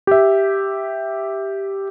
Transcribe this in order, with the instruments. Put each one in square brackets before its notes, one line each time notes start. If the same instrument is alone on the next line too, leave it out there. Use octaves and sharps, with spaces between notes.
[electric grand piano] G4 E5